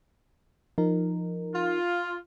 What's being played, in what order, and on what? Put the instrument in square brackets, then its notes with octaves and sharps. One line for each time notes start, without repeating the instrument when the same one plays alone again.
[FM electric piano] F3 D#4 A#4
[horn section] F4